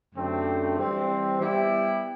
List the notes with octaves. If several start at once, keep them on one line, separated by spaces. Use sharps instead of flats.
F#2 D3 A3 C4 G4
E3 G3 C4
G3 B3 E4 G4